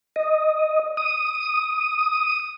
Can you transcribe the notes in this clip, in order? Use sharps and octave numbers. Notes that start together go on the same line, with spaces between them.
D#5
D#6